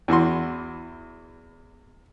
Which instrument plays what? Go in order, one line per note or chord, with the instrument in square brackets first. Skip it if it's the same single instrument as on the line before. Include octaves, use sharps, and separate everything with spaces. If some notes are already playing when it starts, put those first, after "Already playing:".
[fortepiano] E2 E3 F#4 C6